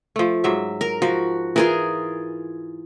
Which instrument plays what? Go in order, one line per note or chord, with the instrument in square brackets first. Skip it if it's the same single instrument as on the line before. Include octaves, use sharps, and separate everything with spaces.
[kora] F3 A3
G#2 F#3 E5
[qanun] A#4
[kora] F3 [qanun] F#4
[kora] E3 [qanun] F4 G#4 A#4